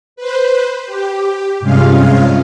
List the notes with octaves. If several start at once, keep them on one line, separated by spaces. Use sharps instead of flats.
B4 C5
G4
G2 C3 G#3 C#4 F4 F5